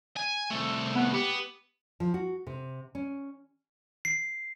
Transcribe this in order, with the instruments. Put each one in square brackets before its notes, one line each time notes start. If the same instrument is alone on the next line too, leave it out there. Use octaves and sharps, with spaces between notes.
[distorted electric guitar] G#5
C2 A3
[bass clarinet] B3
[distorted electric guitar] B3 [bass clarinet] G4
[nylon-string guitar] F3
F#4
C3
C#4
[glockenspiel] C7